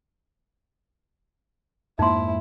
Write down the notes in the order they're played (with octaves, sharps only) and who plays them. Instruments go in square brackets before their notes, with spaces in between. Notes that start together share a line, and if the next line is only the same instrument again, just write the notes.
[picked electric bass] F2 G#2 A#3 [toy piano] D#4 C6 [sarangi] E4